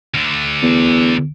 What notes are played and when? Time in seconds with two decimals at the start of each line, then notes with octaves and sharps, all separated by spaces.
0.14 D2 D3
0.62 E2